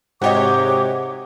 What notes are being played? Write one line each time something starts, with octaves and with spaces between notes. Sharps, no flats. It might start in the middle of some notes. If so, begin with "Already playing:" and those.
G#2 C3 F#4 G4 C#5 D#5 D6